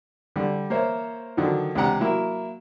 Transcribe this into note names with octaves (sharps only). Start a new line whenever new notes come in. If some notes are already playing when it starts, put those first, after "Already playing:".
D3 G3
A#3 C5 C#5 E5
D3 D#3 F3 F#3
C#2 C3 D4 G4 F#5 A#5
F#3 A#3 E4